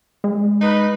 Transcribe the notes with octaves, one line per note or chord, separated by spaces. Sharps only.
G#3
D#4 B4